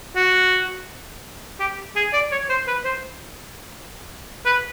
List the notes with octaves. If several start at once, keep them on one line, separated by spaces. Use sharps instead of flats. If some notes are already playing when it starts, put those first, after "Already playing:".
F#4
G4
G#4
D5
C#5
C5
B4
C5
B4